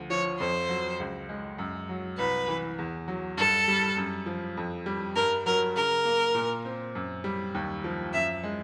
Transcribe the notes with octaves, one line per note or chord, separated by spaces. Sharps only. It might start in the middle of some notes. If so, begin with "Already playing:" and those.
Already playing: D2 F3
F3 C#5
F2 C5
F#3
C#2
G#3
F#2
F#3
C2 B4
E3
E2
F#3
G2 A4
G3
F#2
F3
F2
G3
G2 A#4
F#3 A#4
C#3 A#4
A#3
A#2
C4
F#2
G3
D#2
F3
F#2 E5
G#3